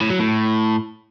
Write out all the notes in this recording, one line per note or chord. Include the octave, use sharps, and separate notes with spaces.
A2
F#3
A2